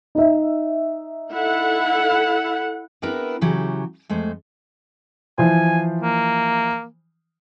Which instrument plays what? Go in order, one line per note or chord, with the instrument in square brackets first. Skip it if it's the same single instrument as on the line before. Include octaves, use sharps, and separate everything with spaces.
[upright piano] D#4 E5
[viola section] E4 A4 F#5
[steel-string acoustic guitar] B3 C4 D4 E4 A#4 B4
C#3 E3 F#3 G4
F2 G#3 A3 C5
[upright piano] E3 F3 C5 [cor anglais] G#5
[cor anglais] A#3